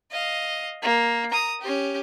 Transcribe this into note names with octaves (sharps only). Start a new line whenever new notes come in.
D#5 F5
A#3
A#5 D#6
C#4 G4